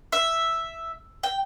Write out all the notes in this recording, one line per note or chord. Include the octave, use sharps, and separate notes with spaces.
E5
G5